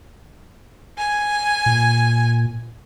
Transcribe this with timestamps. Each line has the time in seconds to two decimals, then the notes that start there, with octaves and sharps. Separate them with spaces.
0.98 G#5
1.66 A#2